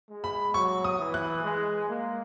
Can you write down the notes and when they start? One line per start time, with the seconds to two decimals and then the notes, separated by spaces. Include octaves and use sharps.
0.09 G#3
0.24 B5
0.54 F#3 C#6
0.84 D#6
0.99 E3
1.14 F#6
1.44 G#3
1.89 A#3